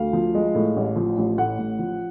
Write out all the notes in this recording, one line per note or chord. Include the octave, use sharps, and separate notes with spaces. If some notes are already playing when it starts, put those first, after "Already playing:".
Already playing: D2 F5
F3
G#3
A2
A1
F3
A1
A2 F#5
A1
F3